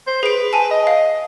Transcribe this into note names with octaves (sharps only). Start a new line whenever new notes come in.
C5
G#4 B4 D7
G#5 A5
D#5
F5